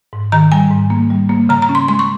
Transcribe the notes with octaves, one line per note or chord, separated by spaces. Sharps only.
G#2
D#3 A#5
G3 G#5
G#2
A#3
G3
A#3
C#3 A#5
A#5
C#4
C6
G#3 C6
C#6